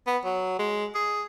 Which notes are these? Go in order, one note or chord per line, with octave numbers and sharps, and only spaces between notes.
B3
F#3
G#3
G#4